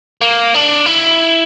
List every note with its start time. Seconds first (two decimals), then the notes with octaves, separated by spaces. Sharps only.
0.21 A#3
0.54 D4
0.86 E4